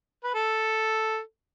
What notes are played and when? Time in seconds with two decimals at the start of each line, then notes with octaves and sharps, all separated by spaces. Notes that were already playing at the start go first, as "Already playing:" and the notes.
0.24 B4
0.34 A4